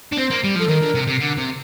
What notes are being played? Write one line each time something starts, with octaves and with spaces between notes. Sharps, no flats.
D4
C4 C5
A#3
G3
F3 A4
D#3 A#4
D3
C3
C3
D3
C3